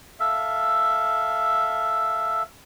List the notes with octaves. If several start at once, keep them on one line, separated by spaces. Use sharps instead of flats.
A4 E5 F5